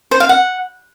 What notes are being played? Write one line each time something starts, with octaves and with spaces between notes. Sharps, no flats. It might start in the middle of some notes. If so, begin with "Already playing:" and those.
C5
F5
F#5